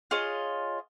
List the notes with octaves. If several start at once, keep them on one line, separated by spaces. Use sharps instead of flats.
F4 G#4 C#5 D#5